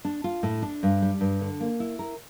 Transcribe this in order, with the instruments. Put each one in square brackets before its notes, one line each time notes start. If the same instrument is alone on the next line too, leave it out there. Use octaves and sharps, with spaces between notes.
[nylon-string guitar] D4
F4
A2
D4
G2
G3
G2
D3
A#3
E4
A#4